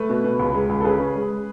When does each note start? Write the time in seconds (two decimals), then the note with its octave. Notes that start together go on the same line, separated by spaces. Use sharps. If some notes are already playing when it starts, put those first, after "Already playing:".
Already playing: A3 B4
0.10 B2
0.24 B2
0.39 C#2
0.54 G#3
0.69 C#2
0.80 A4
0.85 C#3 G#4 B4
1.00 C#4
1.15 G#3